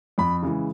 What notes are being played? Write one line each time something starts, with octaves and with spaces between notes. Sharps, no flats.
F2 B5
C#3 E3 G#3